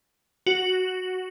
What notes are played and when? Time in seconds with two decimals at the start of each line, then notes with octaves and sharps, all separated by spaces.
0.46 F#4